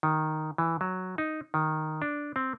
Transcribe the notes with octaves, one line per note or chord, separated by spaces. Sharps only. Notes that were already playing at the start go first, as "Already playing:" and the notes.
D#3
E3
F#3
D#4
D#3
D4
C4